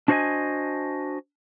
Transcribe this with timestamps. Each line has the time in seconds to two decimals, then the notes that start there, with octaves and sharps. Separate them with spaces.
0.08 D4 F#4 C5 C#5 D#5 G#5